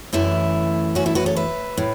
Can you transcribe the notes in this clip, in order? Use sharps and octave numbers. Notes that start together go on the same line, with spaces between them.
F#2 E3 A3 E4
C#4 F#4
E4 A4
F#4 B4
A4 C#5
B4 E5
A2